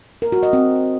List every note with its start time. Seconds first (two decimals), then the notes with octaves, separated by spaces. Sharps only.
0.22 A#4
0.32 F#4
0.43 D#5
0.53 C4